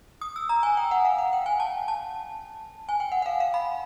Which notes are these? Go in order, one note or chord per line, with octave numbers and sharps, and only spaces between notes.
D#6
E6
A#5
G#5
G5
F#5
F5
F#5
G5
G#5
A5
A5
G#5
G5
F#5
F#5
F5
F5
B5